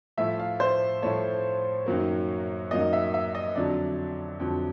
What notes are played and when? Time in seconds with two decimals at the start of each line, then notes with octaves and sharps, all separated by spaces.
0.17 A2 F3 A3 E5
0.39 F5
0.60 C5
1.02 A2 F3 A3 C#5
1.86 F#2 D#3 F#3 A#3
2.71 F#2 D#3 F#3 A#3 D#5
2.93 E5
3.14 E5
3.35 D#5
3.55 F2 D3 F#3 D5
4.40 F2 D3 F#3